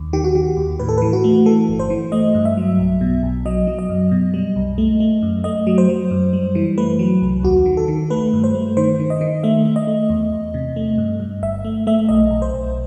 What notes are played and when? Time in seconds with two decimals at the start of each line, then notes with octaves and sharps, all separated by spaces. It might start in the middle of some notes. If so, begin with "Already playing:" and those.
Already playing: D#2
0.13 D#3 G4
0.24 F#4
0.35 D#3 G4
0.57 D#2
0.79 A2 B4
0.89 A4
0.98 E3 B4
1.13 F#4
1.24 A3
1.46 E3 A4
1.68 G1
1.79 C5
1.90 E3
2.12 A3 D#5
2.35 G2
2.45 E5
2.57 F#3
2.79 B1
3.01 B2
3.23 B1
3.46 F#3 D#5
3.67 F#3
3.79 D#5
3.89 F#2
4.11 B2
4.34 G3
4.56 C2
4.78 A3
5.00 A3
5.22 F#2
5.44 A3 D#5
5.67 F#3
5.78 C5
5.89 F#3
6.11 F#2
6.33 G3
6.55 E3
6.78 A3 B4
6.99 F#3
7.22 C2
7.43 D#2 F#4
7.66 D#3
7.77 A4
7.88 D#3
8.10 A3 B4
8.33 G2
8.44 C5
8.55 A3
8.77 D#3 C5
9.00 D#3
9.10 D#5
9.21 D#3
9.43 A3 E5
9.65 A3
9.76 D#5
9.87 A3
10.10 E2
10.32 E2
10.54 C3
10.76 A3
10.98 G2
11.20 G2
11.42 G1 E5
11.65 A3
11.87 A3 E5
12.09 B1 D#5
12.31 B1
12.42 C5
12.53 B1